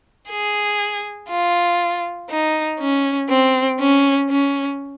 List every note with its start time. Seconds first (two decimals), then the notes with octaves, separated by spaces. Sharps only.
0.29 G#4
1.30 F4
2.30 D#4
2.80 C#4
3.29 C4
3.79 C#4
4.30 C#4